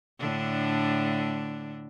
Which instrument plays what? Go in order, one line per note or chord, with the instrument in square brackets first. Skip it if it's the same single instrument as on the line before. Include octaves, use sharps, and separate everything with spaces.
[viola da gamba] A2 D3 D4